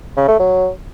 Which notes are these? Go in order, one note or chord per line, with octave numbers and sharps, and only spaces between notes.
C#3
A3
F#3